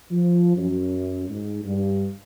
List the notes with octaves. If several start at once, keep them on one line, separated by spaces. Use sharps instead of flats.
F3
F#2
G#2
G2